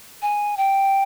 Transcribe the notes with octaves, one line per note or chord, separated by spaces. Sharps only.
G#5
G5